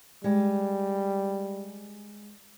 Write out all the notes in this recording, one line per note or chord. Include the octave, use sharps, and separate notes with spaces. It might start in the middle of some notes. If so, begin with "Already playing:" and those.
G3 G#3